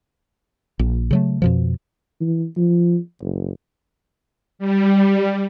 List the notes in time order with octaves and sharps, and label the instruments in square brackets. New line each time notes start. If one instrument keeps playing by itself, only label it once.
[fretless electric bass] A#1
C#3 F#3 A3
F2 B2 F3
[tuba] E3
F3
F#1
[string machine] G3